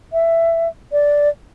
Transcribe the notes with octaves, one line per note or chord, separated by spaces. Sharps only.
E5
D5